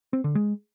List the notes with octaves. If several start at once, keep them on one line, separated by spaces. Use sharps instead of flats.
C4
D3
G#3